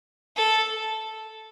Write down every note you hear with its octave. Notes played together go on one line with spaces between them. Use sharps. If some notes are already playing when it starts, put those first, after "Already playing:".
A4